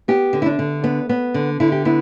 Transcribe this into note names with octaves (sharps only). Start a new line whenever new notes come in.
B3 G4
D3
E4
D4
D3
B3
B3
D3
D3 E4
G4
B3 E4